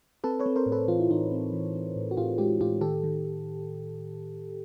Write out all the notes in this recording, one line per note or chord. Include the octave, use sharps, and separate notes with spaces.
C4 A4 B4
B4 C#5
C4
A#4 C5
A2
A4 B4
E3 F4
E4
E3 D#4 F4
C4
E3
C4
A2
F#4
A2 F4 G4
G#3 F4 G4
A2 F4 G4
D#3 G4 A4
D#3